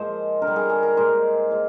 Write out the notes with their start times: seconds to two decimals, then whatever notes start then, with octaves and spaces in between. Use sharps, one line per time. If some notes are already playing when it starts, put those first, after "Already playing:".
Already playing: A#2 F3 G#3 C5 D#5
0.42 D3 A#4
0.47 G3
0.56 G#4
0.70 G#4
0.83 A#4
0.97 A#2 G#3 C5
1.51 A#2 G#3